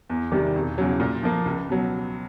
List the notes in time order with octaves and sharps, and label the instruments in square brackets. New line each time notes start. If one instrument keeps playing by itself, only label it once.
[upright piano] E2
C3 D#3 G3
E1
E2 C#3 F#3
A#2
F3 A#3
C#2
B2 F#3